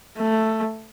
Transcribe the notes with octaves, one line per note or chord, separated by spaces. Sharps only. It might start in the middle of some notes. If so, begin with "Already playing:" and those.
A3